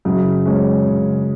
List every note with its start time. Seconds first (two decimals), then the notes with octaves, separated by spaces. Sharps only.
0.05 F#2 C#3 F#3
0.45 G#3 C#4
0.86 C#3